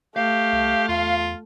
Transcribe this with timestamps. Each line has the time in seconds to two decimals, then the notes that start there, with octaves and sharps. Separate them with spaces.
0.17 A3 G4 F5
0.52 C2
0.89 E2 F4